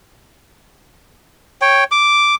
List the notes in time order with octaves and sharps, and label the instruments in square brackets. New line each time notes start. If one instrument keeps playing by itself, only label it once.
[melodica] C#5 G5
D6